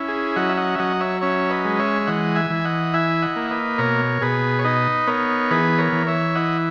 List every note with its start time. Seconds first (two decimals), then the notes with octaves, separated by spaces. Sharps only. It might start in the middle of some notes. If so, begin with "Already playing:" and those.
Already playing: C#4 E4
0.08 G#4
0.36 F#3 D#5 F#5
0.49 E5
0.57 D#5 F#5
0.75 E5
0.79 F#3 D#5 F#5
1.00 C#5 E5
1.21 C#4 C#5 E5
1.50 B4 D#5
1.65 G#3
1.79 C#5 E5
2.07 E3 D#5 F#5
2.36 E5 G#5
2.50 E3
2.56 G#5
2.65 D#5 F#5
2.93 E4 E5 G#5
3.22 D#5 F#5
3.36 A#3
3.51 B4 D#5
3.78 B2 A#4 C#5
4.21 B2 G#4 B4
4.59 C#5
4.64 D#4 B4 D#5
5.07 B3 A#4 C#5
5.51 E3 G#4 B4
5.78 A#4 C#5
5.92 E3
6.07 C#5 E5
6.35 E4 D#5 F#5